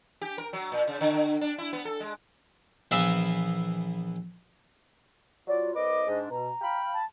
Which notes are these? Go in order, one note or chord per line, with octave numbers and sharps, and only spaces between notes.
G4
A#4
F#3
A#2
C#3
D3
D3
D4
E4
B3
A4
G#3
A#1 E3 B3 E5 F5
F#3 F4 D5
C2 B4 D#5 D6
G#2 D4
B2 A#5
F5 G5 B5
A5